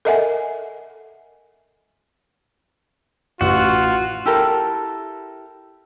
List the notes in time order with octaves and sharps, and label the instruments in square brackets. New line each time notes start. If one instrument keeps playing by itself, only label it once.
[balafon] A4 A#4 D#5 E5 F#5 G#5
[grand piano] A1 [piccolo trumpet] F4 [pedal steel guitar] F#4
[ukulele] E4 G4 A4 A#4